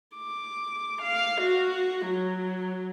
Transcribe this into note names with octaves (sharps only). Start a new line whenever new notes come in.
D6
F5
F#4
F#3